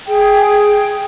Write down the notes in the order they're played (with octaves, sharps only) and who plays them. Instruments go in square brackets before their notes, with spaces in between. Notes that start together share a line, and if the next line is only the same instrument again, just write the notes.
[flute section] G#4 G5